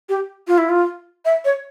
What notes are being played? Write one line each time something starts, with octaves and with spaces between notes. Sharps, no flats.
G4
F4
E4
F4
E5
C#5